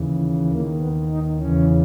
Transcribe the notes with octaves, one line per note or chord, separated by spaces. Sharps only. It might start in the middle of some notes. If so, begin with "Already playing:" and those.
Already playing: D#2 C#3 E3
D#2 D#3 A#3
B3
D#4
E2 C#3 E3 C#4